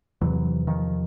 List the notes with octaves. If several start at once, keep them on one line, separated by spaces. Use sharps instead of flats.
E2 C3 E3 F#3
D#3 F3